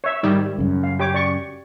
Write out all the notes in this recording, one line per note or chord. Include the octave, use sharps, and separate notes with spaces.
C#5 E5
G#2 D#3 G3
F#2 C#3
F5
G4 C#5 D6
D5 C#6